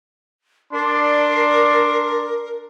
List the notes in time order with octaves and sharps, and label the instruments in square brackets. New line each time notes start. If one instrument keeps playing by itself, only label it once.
[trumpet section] D4 D5 C6 [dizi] A#4